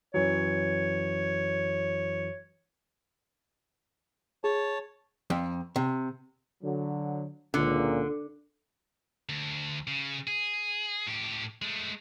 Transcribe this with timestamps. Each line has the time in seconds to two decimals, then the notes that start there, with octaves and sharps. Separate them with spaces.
0.14 F#2 E3 F#3 C#5
4.44 G#4 C#5 A5
5.30 F2
5.76 C3
6.62 D3 F#3
7.54 C#2 A#2 D3
9.29 D2
9.87 C#3
10.27 G#4
11.07 A2 G4
11.62 G#3 A3